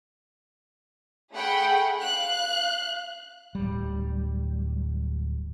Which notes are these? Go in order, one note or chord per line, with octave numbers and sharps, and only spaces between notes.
A3 G#4 F#5 G5 B5
F5 F#6
D1 G3